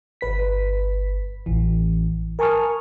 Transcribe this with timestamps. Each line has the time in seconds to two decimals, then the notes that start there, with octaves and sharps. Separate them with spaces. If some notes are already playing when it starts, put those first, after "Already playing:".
0.21 G1 B4 B6
1.46 A1 E3
2.39 A#4 G#5 A5 C#6 D#6 F6